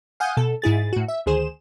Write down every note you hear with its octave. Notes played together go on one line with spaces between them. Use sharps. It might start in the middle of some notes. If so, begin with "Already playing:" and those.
F5 F#5 G#5 D#6 G6
B2 A4
G#2 E4 G#4 A6
A2 F#4
E5
D2 D#3 G#4 C5 E7